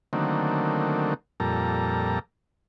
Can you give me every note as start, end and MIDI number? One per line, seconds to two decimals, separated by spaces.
0.13 1.14 50
0.13 1.14 51
0.13 1.14 54
0.13 1.14 57
0.13 1.14 58
0.13 1.14 60
1.40 2.19 41
1.40 2.19 46
1.40 2.19 55
1.40 2.19 69
1.40 2.19 82